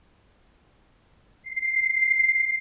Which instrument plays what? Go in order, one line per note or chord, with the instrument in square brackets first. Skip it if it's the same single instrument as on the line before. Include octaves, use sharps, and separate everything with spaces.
[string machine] C7